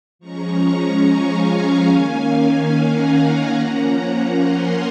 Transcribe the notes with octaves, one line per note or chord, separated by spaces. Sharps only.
F3 G#3 C#4 A#5 C#6
F5 G#5
D#3 A#3 C#4
F#5 A#5
F3 A#3 C#4
G#5 C6